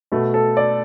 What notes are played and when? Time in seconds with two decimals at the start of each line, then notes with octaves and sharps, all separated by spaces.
0.12 B2 A3
0.34 A4
0.57 D5